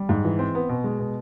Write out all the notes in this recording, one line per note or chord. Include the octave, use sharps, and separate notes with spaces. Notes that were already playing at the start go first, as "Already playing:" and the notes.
Already playing: G3
G#2
E3
C4
B3
B2
G#3
B2